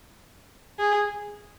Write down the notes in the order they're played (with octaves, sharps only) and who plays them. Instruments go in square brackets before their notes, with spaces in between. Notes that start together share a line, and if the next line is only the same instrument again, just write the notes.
[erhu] G#4